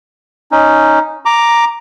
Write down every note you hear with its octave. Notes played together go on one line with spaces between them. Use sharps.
C#4 D#4
A#5 D6